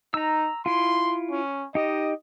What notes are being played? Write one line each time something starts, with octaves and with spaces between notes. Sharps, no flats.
D#4 A#5 E6
E4 F4 C6
C#4
D#4 G4 D#5